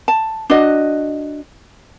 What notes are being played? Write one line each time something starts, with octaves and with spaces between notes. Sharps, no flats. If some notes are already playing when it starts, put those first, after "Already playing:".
A5
D4 F#4 D#5